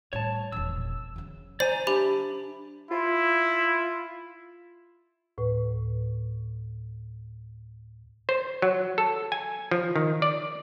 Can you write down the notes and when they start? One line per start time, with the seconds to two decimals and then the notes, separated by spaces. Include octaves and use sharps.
0.13 A2 G3 C#5 A5
0.52 E1 A#1 E6
1.16 C#3 F#3
1.60 C5 D5 G#5 A#5
1.87 D4 G4 E5 B5
2.91 E4 F4
5.38 D2 A2 B4
8.29 C5
8.62 F#3
8.98 A4
9.32 G#5
9.71 F3
9.96 D#3
10.22 D5